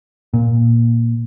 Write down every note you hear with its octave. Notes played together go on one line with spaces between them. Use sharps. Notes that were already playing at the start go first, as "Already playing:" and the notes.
A#2